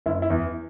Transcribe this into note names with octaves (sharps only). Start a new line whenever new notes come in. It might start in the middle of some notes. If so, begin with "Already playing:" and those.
F#1 E4
E4
E2 E3